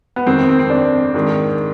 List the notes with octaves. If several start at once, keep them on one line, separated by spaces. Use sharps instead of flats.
B3
F2 D#3 C4
C4
C4
D4
G#2 D#3